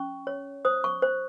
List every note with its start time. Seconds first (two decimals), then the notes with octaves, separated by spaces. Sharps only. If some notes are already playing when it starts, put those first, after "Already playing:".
Already playing: C#4 C#6
0.27 C#5
0.65 C5 D#6
0.84 C#6
1.02 C5